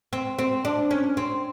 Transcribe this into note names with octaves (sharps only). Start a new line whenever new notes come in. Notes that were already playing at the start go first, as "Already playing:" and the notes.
C4
C4
D4
C#4
C4